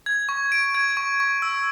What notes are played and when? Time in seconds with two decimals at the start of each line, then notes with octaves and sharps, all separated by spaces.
0.06 G#6
0.29 C#6
0.52 D7
0.75 G#6
0.97 C#6
1.20 C#6
1.42 E6